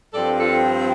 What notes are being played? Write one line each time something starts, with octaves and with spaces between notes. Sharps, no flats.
G2 F3 C4 A4 D5
F4 A4